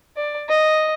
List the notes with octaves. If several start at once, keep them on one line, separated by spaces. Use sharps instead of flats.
D5
D#5